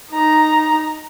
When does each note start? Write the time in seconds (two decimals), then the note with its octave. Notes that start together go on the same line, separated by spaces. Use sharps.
0.11 D#4 A#5